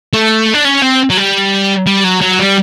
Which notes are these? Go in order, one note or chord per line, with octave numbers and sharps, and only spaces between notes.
A3
D4
C#4
C4
F#3
G3
G3
F#3
F#3
G3